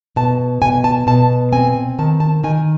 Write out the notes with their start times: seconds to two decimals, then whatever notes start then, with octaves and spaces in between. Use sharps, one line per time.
0.16 B2 A5
0.62 B2 G#5
0.84 A5
1.07 B2 A5
1.53 C4 G#5
1.99 D#3 A5
2.20 A5
2.44 D#3 G#5